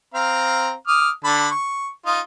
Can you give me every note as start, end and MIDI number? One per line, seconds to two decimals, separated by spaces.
0.14 0.73 60
0.14 0.73 77
0.14 0.73 82
0.87 1.10 86
0.87 1.10 87
0.87 1.10 89
1.24 1.48 50
1.24 1.48 81
1.24 1.48 83
1.51 1.89 85
2.06 2.20 63
2.06 2.20 65